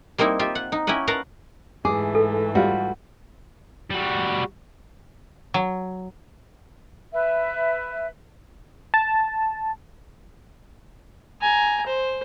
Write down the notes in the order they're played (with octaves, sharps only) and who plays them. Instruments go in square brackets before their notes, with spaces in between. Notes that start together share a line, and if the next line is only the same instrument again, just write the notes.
[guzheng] G3 A#3 C4 D#4 E4
F4 G4 E5
F#5
D#4
C#4 E4 G4 D#5 F#5
A#4 B4 F5 F#5 A5 A#5
[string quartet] G#2 E3 A3 [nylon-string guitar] G#4 [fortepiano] D6
[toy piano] A4
[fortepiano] G3 F4 [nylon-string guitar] F#4
[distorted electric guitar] G3 F#4
[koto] F#3
[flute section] B4 E5
[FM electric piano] A5
[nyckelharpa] G#5 A#5
C5